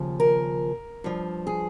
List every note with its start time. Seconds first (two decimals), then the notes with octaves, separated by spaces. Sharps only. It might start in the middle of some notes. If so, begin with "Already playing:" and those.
Already playing: D#2 C#3 F3
0.20 A#4
1.04 G2 F3
1.47 G#4